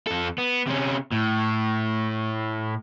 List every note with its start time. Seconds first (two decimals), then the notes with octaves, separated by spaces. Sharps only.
0.07 F2 A4
0.38 B3
0.67 C3 C#4
1.12 A2